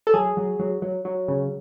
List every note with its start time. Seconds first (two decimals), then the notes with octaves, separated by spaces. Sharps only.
0.07 A4
0.14 F#3 G#4
0.37 F#3
0.60 F#3
0.82 F#3
1.05 F#3
1.28 C#3